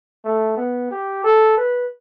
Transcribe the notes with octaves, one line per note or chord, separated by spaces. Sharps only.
A3
B3
G4
A4
B4